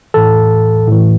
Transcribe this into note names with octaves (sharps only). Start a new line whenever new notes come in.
A2 E3 A4
A2 E3